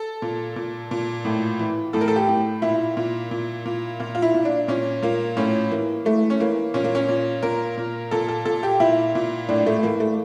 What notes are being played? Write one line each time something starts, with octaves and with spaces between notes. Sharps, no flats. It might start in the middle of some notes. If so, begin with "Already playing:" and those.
Already playing: A4
A#2
A#2
A#2
A2
E3
A2 A4
A#4
A4
G4
A2
A#2 E4
A#2
A#2
A#2
A#2 F4
F4
E4
A#2
D4
A#2 C#4
A#2 A#3
A2 C#4
E3 A#3
E3 A3
C#4
E3 A#3
A#2 C#4
A#3
C#4
A#2
A#2 A#4
A#2
A#2 A4
A4
A#2 A4
G4
A#2 E4
A#2
A2 D4
A3
E3 A#3
A3